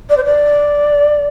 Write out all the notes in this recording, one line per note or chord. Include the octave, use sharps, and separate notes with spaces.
D5
C5
D5